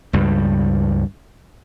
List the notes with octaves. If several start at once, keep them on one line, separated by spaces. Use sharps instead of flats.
C#2 G2 G3